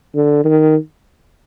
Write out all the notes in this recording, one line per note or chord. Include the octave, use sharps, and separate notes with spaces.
D3
D#3